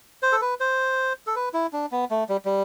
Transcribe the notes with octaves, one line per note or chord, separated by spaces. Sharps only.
C5
A4
B4
C5
A4
B4
E4
D4
B3
A3
G3
G3